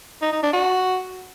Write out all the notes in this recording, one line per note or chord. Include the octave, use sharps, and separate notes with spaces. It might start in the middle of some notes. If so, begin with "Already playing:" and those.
D#4
D#4
D4
F#4